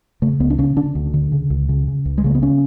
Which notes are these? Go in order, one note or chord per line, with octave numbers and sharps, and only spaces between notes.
C#3 A3
C#2 B3
D4
C#3 C#4
D3 D4
D2
D3
C#3
C#2
C#3
C#3
C#2
G#3
C#3 A3
B3
C#3 C#4